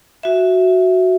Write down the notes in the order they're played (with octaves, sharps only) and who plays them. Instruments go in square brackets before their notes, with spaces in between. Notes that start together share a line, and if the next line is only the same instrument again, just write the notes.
[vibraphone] F#4 E5